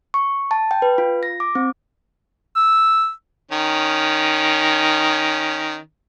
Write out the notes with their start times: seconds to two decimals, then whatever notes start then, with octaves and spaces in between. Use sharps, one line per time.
0.14 C#6
0.51 A5
0.71 G5
0.82 B4
0.98 F4
1.23 A#6
1.40 D6
1.55 C4
2.56 E6
3.52 D#3 C#4